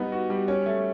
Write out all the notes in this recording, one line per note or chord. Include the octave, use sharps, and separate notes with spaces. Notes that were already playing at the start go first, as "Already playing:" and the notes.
Already playing: G3 B3 D#4
F#4
G3
C#4
A3